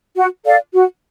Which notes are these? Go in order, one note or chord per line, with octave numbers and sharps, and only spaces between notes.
F#4
A4 D5 F5
F#4